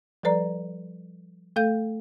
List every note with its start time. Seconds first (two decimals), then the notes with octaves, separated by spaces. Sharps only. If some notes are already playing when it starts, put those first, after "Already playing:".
0.23 F3 G3 A4 B4 D5 A#5
1.56 A3 A4 F5 G6